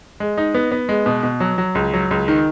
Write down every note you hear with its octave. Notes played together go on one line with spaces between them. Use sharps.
G#3
D#4
B3
B3
G#3
B2
B2
F#3
F#3
C#2
F#3
C#2
D#3